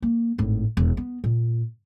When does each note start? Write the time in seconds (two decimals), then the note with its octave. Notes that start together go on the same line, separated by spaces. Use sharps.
0.02 A#3
0.38 G#1 A2
0.77 E1
0.97 B3
1.24 A#2